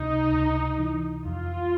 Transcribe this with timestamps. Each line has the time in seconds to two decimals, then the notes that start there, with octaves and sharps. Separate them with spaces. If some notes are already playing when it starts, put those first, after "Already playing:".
Already playing: C#2 C3 D#4
0.33 C#2
0.78 E3
1.25 F2 F4